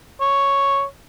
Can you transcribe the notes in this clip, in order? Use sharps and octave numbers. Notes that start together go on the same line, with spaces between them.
C#5